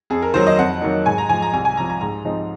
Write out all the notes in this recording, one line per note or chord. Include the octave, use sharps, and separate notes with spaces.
F2 G#4
A#4
D#3 F#3 A#3 C5
D#5
F2 F#5
D#3 F#3 A#3 D#4
G#2 G#5
A#5
F3 G#3 G#5
A#5
C2 G#5
G#5
C3 F3 A#5
A#5
G#2 A#5
F3 G#3 C4 D#4